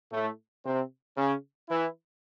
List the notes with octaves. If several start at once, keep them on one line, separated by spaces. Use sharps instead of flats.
A2 A3
C3 C4
C#3 C#4
E3 E4